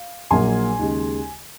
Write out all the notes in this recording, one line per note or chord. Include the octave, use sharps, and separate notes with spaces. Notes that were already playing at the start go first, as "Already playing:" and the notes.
Already playing: F5
A#1 A#2 F#3 A#3 G#5 C6
D#2 C#3 G#3